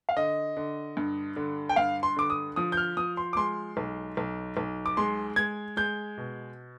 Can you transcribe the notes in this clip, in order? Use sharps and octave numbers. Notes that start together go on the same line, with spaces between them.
F5
D3 D#5
D3
G2
D3
G5
G2 F5
C6
D3 D6
D#6
F3 D#6
G6
F6
F3 D#6
C6
D6
G#3 C6
B1
B1
B1
D6
G#3 C6
G#3 G#6
G#3 G6
B2